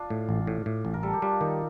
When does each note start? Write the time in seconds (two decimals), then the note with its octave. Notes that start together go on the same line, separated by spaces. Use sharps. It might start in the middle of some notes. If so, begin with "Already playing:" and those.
Already playing: D4 F4
0.10 A2
0.29 A1
0.47 A2
0.66 A2
0.85 A1
0.94 A#4
1.03 G3 A4
1.13 G4
1.22 G3 D4 F4
1.40 D#3 D#4 G4